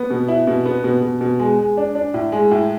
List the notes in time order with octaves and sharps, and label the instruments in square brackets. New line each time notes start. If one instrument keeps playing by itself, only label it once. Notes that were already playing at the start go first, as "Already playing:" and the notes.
Already playing: [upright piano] B3
B2
E4
B2
B3
B2
B2
B2
G#3
G#3
D4
D4
A2
G#3
A2